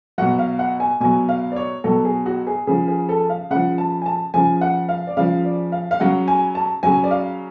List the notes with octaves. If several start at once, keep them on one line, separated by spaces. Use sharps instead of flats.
B2 F#3 F#5
F5
F#5
G#5
B2 F#3 G#5
F5
D5
C#5
B2 F#3 A4
G#4
F#4
G#4
C#3 F3 G#4
G#4
A4
F5
C#3 F3 F#5
A5
G#5
A5
C#3 F3 G#5
F#5
F5
D5
C#3 F3 F5
D5
F5
F5
C#3 F#3 F#5
G#5
A5
C#3 F#3 G#5
D5
F5